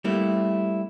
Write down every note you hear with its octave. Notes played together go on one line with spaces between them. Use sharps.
G3 A3 A#3 C4 E4